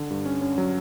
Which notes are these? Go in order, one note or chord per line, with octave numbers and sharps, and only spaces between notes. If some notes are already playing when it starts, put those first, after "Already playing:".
Already playing: D3
G2
C#4
C#4
F#3